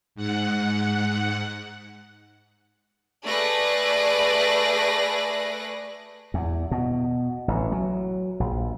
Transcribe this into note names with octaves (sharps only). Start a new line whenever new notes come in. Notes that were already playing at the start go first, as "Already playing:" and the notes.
G#2 F#5
A3 G#4 B4 D5 F#6 A#6
E2
B2
A1
F#3
A#1